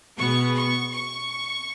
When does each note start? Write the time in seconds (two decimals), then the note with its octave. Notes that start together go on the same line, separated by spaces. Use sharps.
0.18 B2 G#3 B3 C#6
0.54 C#6
0.91 C#6